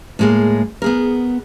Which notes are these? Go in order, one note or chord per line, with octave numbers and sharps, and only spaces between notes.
A2 G#3 A#3
B3 G#4 A#4